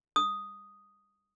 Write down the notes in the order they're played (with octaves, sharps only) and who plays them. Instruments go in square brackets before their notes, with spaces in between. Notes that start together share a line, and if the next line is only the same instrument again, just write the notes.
[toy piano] D#6